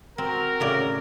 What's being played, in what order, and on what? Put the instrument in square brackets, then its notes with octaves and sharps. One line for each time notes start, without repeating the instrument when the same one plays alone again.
[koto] C4 [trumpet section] F#4 A#4
[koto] A2 C#3 D5